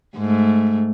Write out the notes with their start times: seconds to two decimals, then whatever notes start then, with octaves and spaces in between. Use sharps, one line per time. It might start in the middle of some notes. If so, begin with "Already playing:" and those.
0.17 G#2 A3